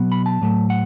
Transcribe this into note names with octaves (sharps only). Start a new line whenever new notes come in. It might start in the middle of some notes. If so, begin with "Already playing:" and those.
Already playing: B2 F#3 B3
B5
A5
A2 F#3 A3
F#5